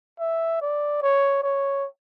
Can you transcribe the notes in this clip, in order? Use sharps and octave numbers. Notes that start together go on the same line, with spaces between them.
E5
D5
C#5
C#5